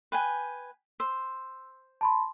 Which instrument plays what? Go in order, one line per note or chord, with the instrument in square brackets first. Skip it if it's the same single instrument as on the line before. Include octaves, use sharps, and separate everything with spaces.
[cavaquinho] B4 G5 G#5
[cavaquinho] C5 [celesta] E6
[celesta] A5 B5 C6